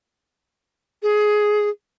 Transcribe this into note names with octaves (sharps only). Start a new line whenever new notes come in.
G#4